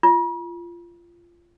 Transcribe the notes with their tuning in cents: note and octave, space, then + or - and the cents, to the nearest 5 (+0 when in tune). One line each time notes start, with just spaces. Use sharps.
F4 -20